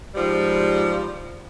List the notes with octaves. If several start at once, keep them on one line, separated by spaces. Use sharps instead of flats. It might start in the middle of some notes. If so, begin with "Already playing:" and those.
G#2 F3 G3